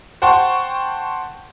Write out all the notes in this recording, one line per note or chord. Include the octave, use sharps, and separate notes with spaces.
C5 F#5 G5 A5 C6 C#6